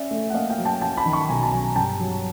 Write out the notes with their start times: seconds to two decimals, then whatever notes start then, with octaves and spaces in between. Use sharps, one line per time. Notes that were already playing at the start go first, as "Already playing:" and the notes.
Already playing: C#4 D5 E5
0.11 A3
0.30 F#5
0.34 A#3 D#5 F5
0.50 F5 G5
0.58 F#3
0.65 G5 A5
0.81 F#3 G5 A5
0.97 A5 B5
1.05 D#3
1.13 B5 C#6
1.29 B1 G#5 A#5
1.43 A5
1.52 F#3 G#5 A#5
1.75 G2 G5 A5
2.00 F#3